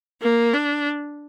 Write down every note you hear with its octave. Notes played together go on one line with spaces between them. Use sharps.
A#3
D4